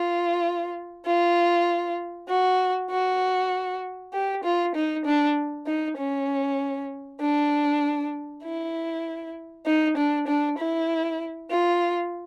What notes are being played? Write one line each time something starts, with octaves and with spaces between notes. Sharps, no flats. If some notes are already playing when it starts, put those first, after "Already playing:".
Already playing: F4
F4
F#4
F#4
G4
F4
D#4
D4
D#4
C#4
D4
E4
D#4
D4
D4
E4
F4